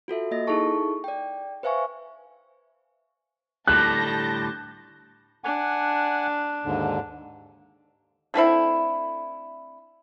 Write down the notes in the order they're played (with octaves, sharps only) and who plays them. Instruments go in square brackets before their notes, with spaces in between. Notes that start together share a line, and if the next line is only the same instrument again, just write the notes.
[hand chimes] F4 F#4 A4 E5
A#3 D#5 A#6
D#4 E4 G#4 A4 A5 C#6
D5 G5
B4 C5 E5 F5 G#5 C#6
[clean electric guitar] A2 D3 G3 [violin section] A5 G6 A#6 [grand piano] F#6
[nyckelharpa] D4 [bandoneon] F#5 G#5
[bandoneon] D#2 G#2 D3
[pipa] D3 A3 C4 E4